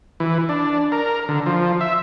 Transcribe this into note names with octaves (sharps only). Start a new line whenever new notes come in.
E3
D4
A#4
D3
F3
E5